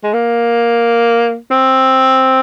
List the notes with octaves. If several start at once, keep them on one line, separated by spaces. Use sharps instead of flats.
G#3
A#3
C4